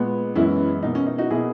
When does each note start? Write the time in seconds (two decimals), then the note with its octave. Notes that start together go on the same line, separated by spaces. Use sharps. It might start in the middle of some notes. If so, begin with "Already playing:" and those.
Already playing: A#2 G#3 B3
0.35 F#2 E3 G#3 B3 C#4 E4
0.83 B2 A#3 D#4
0.95 C#4
1.07 D#4
1.18 D#4 F#4
1.30 B2 A#3 E4 G#4